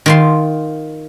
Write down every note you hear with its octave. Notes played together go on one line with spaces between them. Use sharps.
D#3 F4 C6